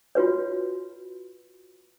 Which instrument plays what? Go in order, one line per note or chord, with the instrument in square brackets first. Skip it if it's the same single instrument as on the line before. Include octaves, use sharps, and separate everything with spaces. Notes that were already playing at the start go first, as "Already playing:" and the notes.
[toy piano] F4 F#4 B4 C#5